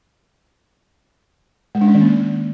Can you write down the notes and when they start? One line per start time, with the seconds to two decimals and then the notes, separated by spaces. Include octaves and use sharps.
1.75 G#3
1.81 D4
1.88 C#4
1.94 D#3
2.01 A#3